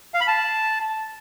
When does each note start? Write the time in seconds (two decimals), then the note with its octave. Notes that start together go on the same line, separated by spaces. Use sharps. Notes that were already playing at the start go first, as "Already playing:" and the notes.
0.14 F5
0.21 B5
0.28 A5